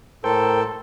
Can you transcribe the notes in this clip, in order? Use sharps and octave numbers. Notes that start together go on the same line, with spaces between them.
A2 A4 A#4 C5 G5